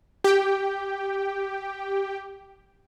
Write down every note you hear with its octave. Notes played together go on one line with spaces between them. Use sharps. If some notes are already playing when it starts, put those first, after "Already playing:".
G4 G5